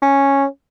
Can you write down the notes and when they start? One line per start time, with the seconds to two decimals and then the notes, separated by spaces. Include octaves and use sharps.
0.02 C#4